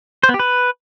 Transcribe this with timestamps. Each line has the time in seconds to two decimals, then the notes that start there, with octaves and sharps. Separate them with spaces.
0.23 C5
0.29 B3
0.34 G4
0.40 B4